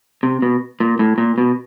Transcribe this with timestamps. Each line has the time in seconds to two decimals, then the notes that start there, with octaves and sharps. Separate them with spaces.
0.23 C3
0.42 B2
0.80 A#2
0.99 A2
1.18 A#2
1.38 B2